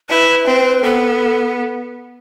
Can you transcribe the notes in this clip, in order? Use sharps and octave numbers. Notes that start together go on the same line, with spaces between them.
E4 B4
C4
B3 A4